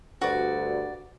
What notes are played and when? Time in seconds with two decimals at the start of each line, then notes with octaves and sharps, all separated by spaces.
0.21 D2 G2 F#4 D5